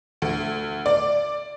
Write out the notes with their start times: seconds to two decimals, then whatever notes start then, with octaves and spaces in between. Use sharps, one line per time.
0.22 D2
0.86 D5